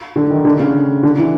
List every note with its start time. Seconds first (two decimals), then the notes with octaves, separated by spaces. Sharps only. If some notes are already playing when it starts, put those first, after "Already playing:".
0.16 D3
0.30 D#3
0.45 D3
0.60 C#3
1.03 D3
1.18 E3